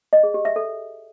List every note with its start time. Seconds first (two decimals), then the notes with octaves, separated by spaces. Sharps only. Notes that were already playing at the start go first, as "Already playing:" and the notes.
0.13 D#5
0.23 G#4
0.34 G4
0.45 E5
0.56 A4